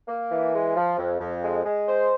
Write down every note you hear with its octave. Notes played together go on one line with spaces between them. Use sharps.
A#3
E3
G#3
F3
F2
F2
G#3
G#3
C5